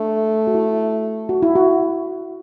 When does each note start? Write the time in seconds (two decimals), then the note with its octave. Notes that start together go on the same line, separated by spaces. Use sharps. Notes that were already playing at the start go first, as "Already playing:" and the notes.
Already playing: A3 D4
0.47 F#4
0.54 E4
1.29 F#4
1.42 E4
1.55 F#4